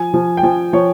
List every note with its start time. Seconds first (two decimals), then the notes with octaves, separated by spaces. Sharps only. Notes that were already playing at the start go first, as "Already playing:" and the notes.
Already playing: F3 G#5
0.14 F3
0.37 G5
0.43 F3 G#5
0.73 F3 C#5